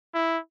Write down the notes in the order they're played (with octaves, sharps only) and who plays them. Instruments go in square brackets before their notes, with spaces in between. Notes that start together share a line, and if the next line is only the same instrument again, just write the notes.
[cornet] E4